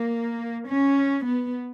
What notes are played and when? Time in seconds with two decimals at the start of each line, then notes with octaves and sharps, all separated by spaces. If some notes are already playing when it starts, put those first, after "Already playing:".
Already playing: A#3
0.69 C#4
1.27 B3